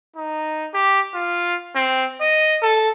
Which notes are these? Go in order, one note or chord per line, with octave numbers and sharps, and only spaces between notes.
D#4
G4
F4
C4
D#5
A4